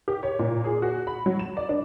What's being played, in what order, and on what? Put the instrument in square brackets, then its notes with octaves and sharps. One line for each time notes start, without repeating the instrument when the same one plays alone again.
[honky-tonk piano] G4
C#5
A#2
G#4
F#4
B5
F#3
E7
D5
D4